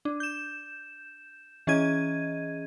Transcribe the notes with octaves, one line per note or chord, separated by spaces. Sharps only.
D4
G6 E7
E3 C#4 G#4 D#5 G#6 D#7